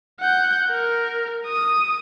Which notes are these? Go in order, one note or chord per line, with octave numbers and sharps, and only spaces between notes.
F#5 G6
A#4
D#6